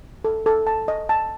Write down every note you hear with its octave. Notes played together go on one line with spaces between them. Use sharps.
A4
A4
A5
D#5
A5